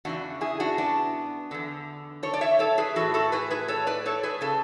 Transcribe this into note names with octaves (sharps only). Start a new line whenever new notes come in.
E2 C#3 E3 D4 F#4
E4 G#4
D4 F#4
B3 D4
E2 D3
A4 C#5
D5
C#5 E5
A4 C#5
G#4 B4
A2 E3 F#4 A4
F#4 A4
G#4 B4
G#4 B4
A4 C#5
B4 D5
A4 C#5
G#4 B4
C#3 A4